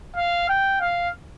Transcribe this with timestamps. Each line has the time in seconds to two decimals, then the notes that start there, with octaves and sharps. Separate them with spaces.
0.17 F5
0.49 G5
0.81 F5